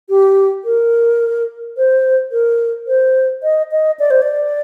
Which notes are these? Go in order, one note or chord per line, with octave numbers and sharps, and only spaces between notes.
G4
A#4
C5
A#4
C5
D#5
D#5
D5
C5
D5